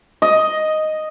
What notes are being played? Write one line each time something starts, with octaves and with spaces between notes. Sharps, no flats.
D#5